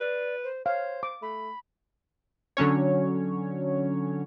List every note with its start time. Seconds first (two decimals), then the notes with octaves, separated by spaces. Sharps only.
0.01 B4 D5
0.44 C5
0.66 C5 C#5 F5
1.03 D6
1.22 A3 B5
2.57 D3 F#3 C#4 C#5